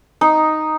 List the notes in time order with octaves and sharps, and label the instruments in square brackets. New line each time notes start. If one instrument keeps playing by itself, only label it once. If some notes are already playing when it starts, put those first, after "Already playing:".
[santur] D#4